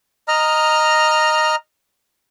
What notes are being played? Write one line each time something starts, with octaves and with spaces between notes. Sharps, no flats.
D#5 A#5 F6